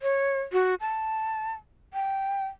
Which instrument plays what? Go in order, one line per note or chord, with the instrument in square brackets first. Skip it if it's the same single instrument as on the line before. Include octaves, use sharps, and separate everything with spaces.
[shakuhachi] C#5
F#4
A5
G5